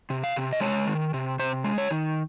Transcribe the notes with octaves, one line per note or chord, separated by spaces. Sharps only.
C3
F5
C3
D#5
G#3 C#5
D#3
C3
C3 C5
G#3
C#5
D#3